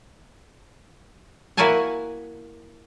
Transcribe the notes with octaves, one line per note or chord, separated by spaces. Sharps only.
A#3 E4 F#4 F5 G#5 A5